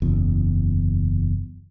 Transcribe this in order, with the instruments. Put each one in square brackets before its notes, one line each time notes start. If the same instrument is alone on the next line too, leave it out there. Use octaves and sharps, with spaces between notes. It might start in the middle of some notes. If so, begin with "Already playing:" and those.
[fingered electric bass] F#1 E2